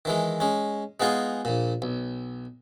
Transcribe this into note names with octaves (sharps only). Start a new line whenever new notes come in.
D#3 E3 G#3
G#3 C#4
G#3 B3 D#4 F4 G#4
A#1 A#2
B1